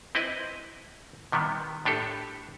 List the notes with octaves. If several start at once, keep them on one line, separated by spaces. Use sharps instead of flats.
C4 E4 B4 D#5
C3 D#3 G3 B3
A2 D4 G4 A4